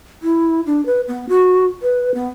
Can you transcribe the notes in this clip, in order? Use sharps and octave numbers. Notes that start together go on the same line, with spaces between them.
E4
D4
B4
B3
F#4
B4
B3